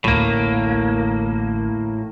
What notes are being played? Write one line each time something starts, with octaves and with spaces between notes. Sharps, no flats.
A1 D2 A2 A#3